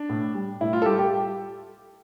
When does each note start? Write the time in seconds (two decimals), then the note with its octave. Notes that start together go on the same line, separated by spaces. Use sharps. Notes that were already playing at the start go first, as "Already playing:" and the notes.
Already playing: D4
0.10 A2
0.34 G3
0.61 A2 E4
0.73 F4
0.82 A4
0.86 G3 G4
0.99 G4